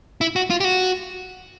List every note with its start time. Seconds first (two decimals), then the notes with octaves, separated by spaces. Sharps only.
0.21 E4
0.36 F#4
0.50 F4
0.60 G4
0.64 F#4